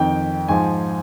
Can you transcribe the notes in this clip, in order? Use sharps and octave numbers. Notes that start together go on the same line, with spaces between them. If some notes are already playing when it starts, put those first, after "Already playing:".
Already playing: F2 D#3 G5
G#2 F3 G#5